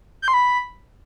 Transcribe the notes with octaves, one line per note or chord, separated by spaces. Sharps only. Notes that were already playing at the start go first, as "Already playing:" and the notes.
G6
C6
B5